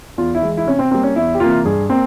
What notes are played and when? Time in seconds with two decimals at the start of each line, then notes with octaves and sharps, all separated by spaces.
0.18 E2 F4
0.35 E4
0.42 E3 G#3
0.57 E4
0.66 C3 C#4
0.79 C4
0.91 G3 A#3 C4
1.03 C#4
1.16 E2 E4
1.35 G4
1.40 C3 E3 A#3 F4
1.65 G2 G#4
1.89 A#3 C4